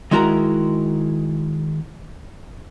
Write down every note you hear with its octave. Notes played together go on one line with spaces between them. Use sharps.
D#3 G#3 E4 F#4 A#4 A#5